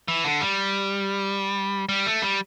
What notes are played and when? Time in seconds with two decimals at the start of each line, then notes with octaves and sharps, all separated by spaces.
0.08 E3
0.25 D3
0.41 G3
1.89 G3
2.06 A3
2.22 G3